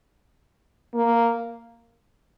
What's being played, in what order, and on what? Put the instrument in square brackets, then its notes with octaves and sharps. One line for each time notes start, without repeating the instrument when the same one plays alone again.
[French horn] A#3